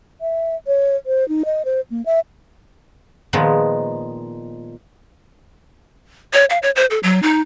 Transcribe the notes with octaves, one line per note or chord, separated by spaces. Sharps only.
E5
C#5
C5
D#4
D#5
C5
A#3
E5
A#2 D#3 F3 G#3 B3
C#5
F5
C#5
C5
A4
F#3
D#4